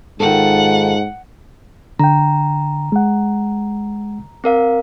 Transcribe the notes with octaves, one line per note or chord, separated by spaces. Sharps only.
G#2 D#3 F4 A4 F#5
D3 G5 A#5
G#3 F#5
C4 A#4 F5